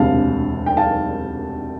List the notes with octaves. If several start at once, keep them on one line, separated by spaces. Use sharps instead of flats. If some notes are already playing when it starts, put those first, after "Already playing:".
Already playing: E1 D2 C3 F5 A5
G5
F5 A5